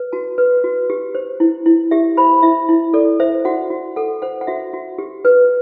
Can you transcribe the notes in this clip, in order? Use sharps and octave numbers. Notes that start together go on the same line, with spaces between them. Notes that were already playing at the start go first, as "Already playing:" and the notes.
Already playing: B4
F#4 A5
B4
F#4
G4
C5
E4
E4
G4 E5
C5 B5
E4 E5
E4
A4 D5
C5 E5
F#4 F#5
F#4
A4 F#5
C5 F#5
F#5
F#4 E5
F#4
G4
B4